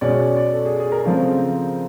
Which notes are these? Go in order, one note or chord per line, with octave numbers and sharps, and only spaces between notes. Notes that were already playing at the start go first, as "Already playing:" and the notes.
B2 G#3 C#4 D5
D5
A4
G#4
G#4
A#4
C#3 F3 A3 C4